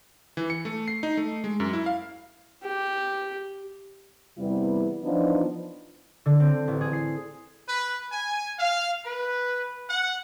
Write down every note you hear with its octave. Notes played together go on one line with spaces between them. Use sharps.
E3
C#7
A3
C7
D#4
A3
G#3
F#2
E4
F5
G4
E2 C3 G3 B3 E4
E3 F3 B3 D4 D#4
D3
C4
A1
G#4
C7
B4
G#5
F5
B4
F#5